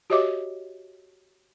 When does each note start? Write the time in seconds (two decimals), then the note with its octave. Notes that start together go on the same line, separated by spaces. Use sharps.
0.10 F#4 G4 C#5 D#5 E5 D6